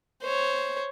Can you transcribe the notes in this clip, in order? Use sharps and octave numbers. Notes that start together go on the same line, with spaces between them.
C5 C#5